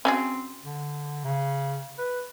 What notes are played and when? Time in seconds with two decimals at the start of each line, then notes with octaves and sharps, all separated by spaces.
0.05 C4 C#4 F#4 G#4
0.63 D3
1.25 C#3
1.98 B4